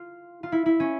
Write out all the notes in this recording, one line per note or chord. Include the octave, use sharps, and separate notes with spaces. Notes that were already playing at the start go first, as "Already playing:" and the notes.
Already playing: F4
F4
E4
E4
C#4